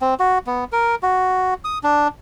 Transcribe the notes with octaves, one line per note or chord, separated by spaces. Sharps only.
C4
F#4
B3
A#4
F#4
D#6
D4